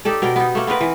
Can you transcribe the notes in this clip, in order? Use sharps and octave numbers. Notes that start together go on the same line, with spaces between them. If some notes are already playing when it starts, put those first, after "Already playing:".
D#4 G4 A4 D5
B2 A#4 D5 G5
B3 D#4
A3 A#3
B3 C4 A#4 B4
E3